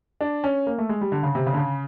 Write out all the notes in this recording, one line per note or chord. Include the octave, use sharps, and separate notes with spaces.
D4
C#4
A#3
A3
G#3
G3
D3
C#3
C3
C#3
D3
C#3